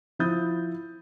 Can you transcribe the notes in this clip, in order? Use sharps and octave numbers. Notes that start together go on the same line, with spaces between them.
F3 E4 D#6 G6 A6